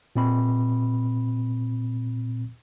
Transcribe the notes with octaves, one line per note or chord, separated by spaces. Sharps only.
A#2 C4 B5